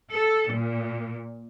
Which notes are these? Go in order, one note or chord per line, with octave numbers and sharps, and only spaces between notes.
A4
A#2